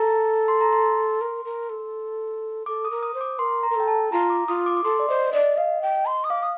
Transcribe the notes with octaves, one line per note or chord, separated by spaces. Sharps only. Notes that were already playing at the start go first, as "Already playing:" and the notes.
Already playing: A4 A#5
C6
A#5
C6
A#4
A#4
A4
A4 D6
D#6
A#4
D#6
C5
D6
A#4 C6
A#5
A#4
A4 G5
A5
F4 A#5
D6
F4 D#6
D6
D6
A4 C6
D5
C5 D#5
D5 D#5
D#5 F5
G5
C6
D#6
F5 D6
D#6